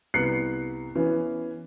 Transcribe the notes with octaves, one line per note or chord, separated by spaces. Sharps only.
C2 B3 F#6 C7 C#7
E3 B3 C#4